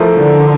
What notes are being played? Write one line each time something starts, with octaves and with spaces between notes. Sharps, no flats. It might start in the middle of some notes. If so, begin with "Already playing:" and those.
Already playing: F3 A3 E4 A#4
D3